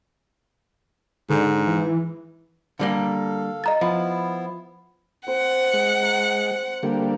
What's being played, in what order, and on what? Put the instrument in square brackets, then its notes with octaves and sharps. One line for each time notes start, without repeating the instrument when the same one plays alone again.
[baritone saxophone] G#2 [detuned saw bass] D3
[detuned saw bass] E3
[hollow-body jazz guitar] D3 G3 A#3 [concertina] A4 F5
[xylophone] D#5 A#5 A6
[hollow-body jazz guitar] F3 [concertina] B3 E4
[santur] C4 C5 [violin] F#5
[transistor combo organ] G#3
[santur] A#5
[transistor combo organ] D3 G3 A#3 [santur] G5